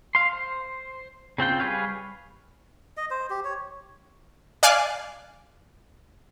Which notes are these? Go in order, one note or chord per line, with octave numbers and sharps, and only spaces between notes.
F5 C6
C5
C#3 C4 F4 G5
G3 G#4 B4 C#5 F5
D#5
C5
G4
C#5
D5 F5 G#5 F#6